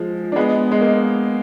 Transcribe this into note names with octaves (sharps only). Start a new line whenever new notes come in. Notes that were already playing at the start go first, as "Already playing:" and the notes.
Already playing: F3 G#3
D4
G#3 B3
G#3
A#3